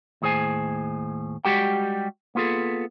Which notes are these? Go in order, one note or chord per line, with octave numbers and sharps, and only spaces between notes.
D#2 A2 G#4 C5 G#5
G3 G#3 F#4 G4 F#5 G5
A#3 B3 F4 G#4 A4